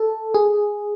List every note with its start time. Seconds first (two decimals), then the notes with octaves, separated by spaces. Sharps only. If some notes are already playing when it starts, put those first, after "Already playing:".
Already playing: A4
0.34 G#4